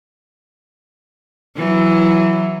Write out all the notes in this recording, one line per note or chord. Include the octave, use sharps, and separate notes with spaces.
E3 F#3 E4